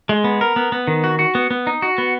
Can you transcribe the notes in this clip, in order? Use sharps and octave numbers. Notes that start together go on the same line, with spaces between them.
G#3
B3
A#4
B3
B3
D#3
F#4
F#4
B3
B3
D#4
F#4
B3